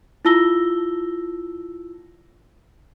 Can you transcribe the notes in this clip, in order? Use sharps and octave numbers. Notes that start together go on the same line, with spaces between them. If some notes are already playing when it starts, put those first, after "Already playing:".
E4 F4 A5 E6 A#6 G7